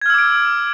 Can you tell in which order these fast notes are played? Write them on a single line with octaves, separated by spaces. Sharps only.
G#6 F6 E6 D6 D7